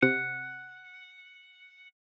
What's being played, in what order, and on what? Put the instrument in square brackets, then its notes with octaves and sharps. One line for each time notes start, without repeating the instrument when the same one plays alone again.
[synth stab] C3 [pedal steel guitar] F#5